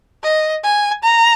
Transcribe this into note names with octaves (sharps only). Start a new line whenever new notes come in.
D#5
G#5
A#5